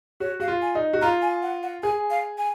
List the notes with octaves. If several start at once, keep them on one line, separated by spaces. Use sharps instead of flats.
F#4 C#5
F#4 F5
F4
G#5
D#4
F#4
F4 A#5
G#5
F#5
F#5
G#4 G#5
F5
G#5